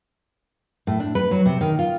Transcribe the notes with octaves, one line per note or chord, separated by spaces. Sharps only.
A2
D4
B4
F#3
C3
D#3
F4